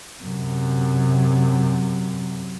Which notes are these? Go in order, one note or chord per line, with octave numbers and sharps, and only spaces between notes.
F#2 C3